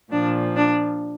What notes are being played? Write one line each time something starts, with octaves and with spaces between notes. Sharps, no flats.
A#2 F3 D4
D4